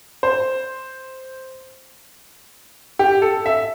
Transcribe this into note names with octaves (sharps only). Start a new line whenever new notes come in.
C5
G4
A4
E5